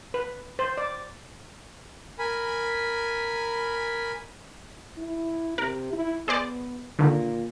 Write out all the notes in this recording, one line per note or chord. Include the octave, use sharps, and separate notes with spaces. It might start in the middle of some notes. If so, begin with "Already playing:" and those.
B4
C5
D5
A#4 G#5 B5
E4
C3 A#4
E4
B3 G#4 C5 D5
A#2 D3 D#3